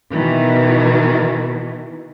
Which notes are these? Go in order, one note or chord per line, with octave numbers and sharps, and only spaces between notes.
B2 D#3 E3